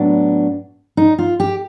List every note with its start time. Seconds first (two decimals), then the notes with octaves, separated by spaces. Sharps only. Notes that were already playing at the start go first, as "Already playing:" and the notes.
Already playing: A2 F#3 B3 D4
0.97 D#4
1.19 F4
1.40 G4